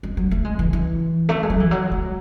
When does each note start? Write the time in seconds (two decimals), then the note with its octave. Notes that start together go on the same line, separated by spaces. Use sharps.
0.03 G#3
0.17 F#3
0.31 A3
0.45 G#3
0.59 E3
0.73 E3
1.29 A3
1.43 G#3
1.50 F#3
1.60 E3
1.71 F#3
1.92 G#3